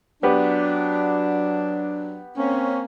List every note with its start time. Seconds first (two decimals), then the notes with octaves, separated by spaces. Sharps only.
0.23 F#3 B3 D4 G4 B4
2.37 A#3 C4 C#4